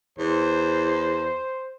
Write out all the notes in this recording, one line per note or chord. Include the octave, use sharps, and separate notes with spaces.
E2 C5